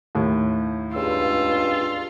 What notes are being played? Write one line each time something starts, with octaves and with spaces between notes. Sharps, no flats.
D#2 A2
C#2 G2 F4 E6